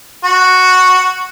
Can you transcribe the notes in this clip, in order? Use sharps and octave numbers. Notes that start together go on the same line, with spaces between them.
F#4